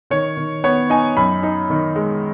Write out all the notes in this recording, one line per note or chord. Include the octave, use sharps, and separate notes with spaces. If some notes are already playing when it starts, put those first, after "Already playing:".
D#3 C#5
D#3
B3 C#5
D#4 G#5
F#2 B5
D#4
D#3
G#3